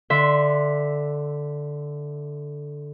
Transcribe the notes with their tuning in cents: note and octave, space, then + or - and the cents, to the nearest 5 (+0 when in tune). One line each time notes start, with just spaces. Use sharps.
D3 +0 E5 -5 C6 +0